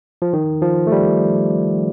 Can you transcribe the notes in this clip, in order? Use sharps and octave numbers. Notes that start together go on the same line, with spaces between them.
F3
D#3
F3
A3
G3